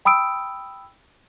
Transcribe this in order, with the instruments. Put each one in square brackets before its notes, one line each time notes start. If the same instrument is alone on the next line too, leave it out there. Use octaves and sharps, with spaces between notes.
[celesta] G5 B5 D#6 E6 D7